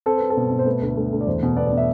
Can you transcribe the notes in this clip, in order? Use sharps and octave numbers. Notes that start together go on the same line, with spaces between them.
C4 A4
C4 B4
A4
B2
B2
C5
A3 B4
D2
D2
D2
D5
E2 C5
B2
B3 D5
B2 D5
E5